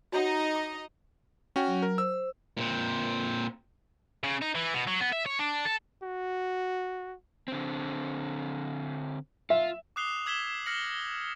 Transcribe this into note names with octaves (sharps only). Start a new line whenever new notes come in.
D#4 F#4 C#5 D#5 F#5 A#5
D6
C#4 F#4 G5
F#3
A#4
C5 E6
A#2 C4
C#3
D#4
E3
B2
F#3
B3
E5
C#5
D4
A4
F#4
D3 C4
F4 E5
D6 D#6 F#6 C7 F7 G7
D6 E6 G#6 B6 E7 G7
F6 A#6 C#7 F#7